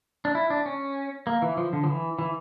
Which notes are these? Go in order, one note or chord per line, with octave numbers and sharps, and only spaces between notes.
D4
E4
D4
C#4
A#3
E3
F3
D3
F3
E3
E3